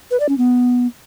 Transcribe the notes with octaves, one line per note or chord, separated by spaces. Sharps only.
B4
D5
C#4
B3